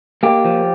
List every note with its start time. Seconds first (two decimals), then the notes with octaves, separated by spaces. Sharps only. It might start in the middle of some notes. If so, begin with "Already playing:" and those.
0.23 A#3 G4
0.45 F3